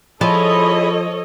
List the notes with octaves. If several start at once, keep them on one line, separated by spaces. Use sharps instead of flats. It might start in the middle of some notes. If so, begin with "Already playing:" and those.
F3 E4 G#4 A4 C#5 D#5 B5